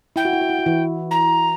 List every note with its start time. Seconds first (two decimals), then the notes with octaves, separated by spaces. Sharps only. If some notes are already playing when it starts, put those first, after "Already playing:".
0.16 E4 G5
0.25 F#4
0.33 E4
0.41 F#4
0.49 E4
0.59 F#4
0.66 E3 E4
1.10 A#5